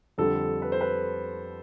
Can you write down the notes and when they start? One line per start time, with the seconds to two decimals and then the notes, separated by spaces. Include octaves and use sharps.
0.18 F2 D3 G3 A4
0.62 B4
0.72 C5
0.81 B4